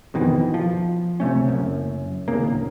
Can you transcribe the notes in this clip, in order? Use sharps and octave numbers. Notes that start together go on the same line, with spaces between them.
F2 B2 D#3 E3
F3
C#2 C3 A3 C#4
F#1 F#2
D#1 C#3 A#3
D1